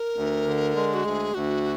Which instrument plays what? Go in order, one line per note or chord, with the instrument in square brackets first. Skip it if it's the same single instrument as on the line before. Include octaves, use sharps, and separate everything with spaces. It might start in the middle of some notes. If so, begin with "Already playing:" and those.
Already playing: [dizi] A#4
[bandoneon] D2
D3
G#3
[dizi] F#4
[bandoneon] D2 [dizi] G#4
[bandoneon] D2 [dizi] F#4